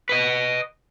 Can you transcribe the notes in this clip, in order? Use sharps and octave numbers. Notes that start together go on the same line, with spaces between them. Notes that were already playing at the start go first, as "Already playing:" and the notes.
B4 D#5